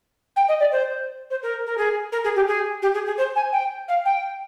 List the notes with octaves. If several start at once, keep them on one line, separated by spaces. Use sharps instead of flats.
G5
D#5
D5
C5
C5
A#4
A#4
G#4
A#4
G#4
G4
G#4
G4
G#4
G#4
C5
G#5
G5
F5
G5